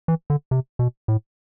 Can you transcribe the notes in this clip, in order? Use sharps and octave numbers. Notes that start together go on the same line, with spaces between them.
E3
D3
C3
B2
A2